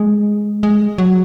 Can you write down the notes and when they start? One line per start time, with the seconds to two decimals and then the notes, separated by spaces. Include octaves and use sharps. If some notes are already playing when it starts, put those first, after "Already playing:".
Already playing: G#3
0.63 G#3
0.98 F#3